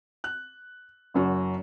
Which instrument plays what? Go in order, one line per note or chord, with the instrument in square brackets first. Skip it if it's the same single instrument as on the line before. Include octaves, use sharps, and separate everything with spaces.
[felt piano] F#6
F#1 F#2 F#4